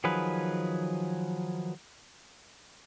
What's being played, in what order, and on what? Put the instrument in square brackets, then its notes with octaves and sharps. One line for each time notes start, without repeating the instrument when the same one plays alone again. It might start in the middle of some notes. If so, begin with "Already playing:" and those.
[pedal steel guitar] D#3 F3 F#3 G#4 B4